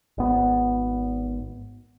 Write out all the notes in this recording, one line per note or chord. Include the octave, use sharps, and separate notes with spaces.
G#1 B3